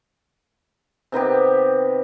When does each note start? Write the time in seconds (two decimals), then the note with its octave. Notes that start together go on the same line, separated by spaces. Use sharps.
1.12 C3 D#3 B3 G4